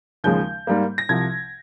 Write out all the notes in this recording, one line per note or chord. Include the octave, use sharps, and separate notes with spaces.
D#2 C#3 F3 G#3 G6
G#2 G3 A#3
A#6
C2 C3 F3 G#6